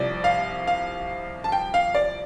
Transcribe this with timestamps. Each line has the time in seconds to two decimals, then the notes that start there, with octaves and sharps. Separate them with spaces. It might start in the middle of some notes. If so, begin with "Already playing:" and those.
Already playing: C2 C3 F3 D5
0.24 F5
0.67 F5
1.44 A5
1.52 G5
1.74 F5
1.95 D5